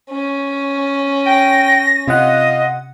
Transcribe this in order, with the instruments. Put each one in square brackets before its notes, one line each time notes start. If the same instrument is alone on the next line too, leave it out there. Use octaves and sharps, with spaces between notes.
[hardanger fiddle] C#4
[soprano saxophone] G5 [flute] A#6
[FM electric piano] C3 F#5 [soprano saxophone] F4 [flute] D#5